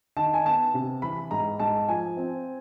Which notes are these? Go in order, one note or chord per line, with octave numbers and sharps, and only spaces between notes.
D#3 A5
G#5
B3 A5
C3
E3 B5
G#2 A#5
G#2 A5
F3 G#5
C4